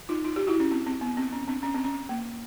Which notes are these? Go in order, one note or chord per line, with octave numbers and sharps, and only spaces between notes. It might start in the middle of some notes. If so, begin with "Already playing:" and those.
D#4 F4
D#4 F4
F4 G4
E4 F#4
C#4
C4
C4
B3
C4
C#4
C4 D4
C#4
C4
C#4
A#3